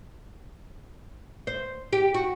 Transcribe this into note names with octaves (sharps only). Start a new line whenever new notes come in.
C5
G4
F#4